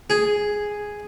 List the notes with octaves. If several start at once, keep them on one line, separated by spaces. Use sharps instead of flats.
G#4